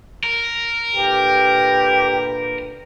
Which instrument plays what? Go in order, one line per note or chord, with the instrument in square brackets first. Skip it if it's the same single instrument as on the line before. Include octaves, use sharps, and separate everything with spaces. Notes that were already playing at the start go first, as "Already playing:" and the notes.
[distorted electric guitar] A#4
[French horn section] A#2 D3 B4 [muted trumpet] G4